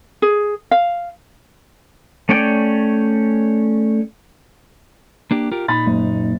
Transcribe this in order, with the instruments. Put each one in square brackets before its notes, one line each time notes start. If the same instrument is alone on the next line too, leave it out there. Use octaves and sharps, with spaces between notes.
[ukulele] G#4
F5
[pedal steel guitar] A3 C#4 C#5 D5 G5
[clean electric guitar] A#3 D4 G4
F4 G4 A#4
[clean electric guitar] A#2 D#4 [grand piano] B5 A6
[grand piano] F#1